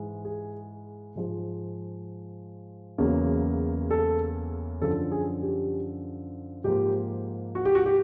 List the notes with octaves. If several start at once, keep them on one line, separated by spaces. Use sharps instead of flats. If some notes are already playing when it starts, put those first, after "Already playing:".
Already playing: G#2 E3 G#3
G#4
G#2 F3 G#3
E2 C#3 F#3 A#3
A4
F#2 D3 F3 A4
G#4
G4
G#2 F3 A#3 G4
F#4
G4
F#4
G4